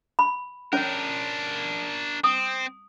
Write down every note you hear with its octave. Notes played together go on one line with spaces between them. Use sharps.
B5
C#4 D4 A#4 C#5
C4 D#6